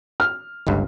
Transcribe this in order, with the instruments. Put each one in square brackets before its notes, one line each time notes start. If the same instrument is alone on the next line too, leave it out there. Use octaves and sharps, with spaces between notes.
[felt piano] F6
[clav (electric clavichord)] G1 C#2 G2